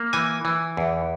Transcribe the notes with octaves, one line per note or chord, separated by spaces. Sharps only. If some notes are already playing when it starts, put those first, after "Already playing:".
Already playing: A#3
E3 G#5
E3
E2